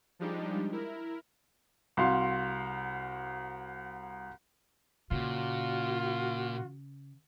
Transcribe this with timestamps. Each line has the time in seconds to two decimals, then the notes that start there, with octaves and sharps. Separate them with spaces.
0.19 F3 G3 G#3 D4 D#4 G4
0.72 E4 A#4
1.97 C2 F#4 F5 C6
5.11 A#2 C#3 F4 F#4